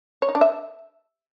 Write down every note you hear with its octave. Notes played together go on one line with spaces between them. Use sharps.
C#5
D#4
D4
E5